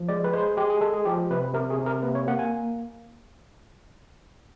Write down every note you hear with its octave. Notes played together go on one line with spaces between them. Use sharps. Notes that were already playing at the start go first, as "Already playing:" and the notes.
Already playing: F3
G#3 D5
B4
G#3 C5
G#3 G4
G#4
G#3 A4
G#4
F3 G4
C3 B4
C3 A#4
G#4
C3
A#4
A#3 B4
C#5
A#3 F#5
G#5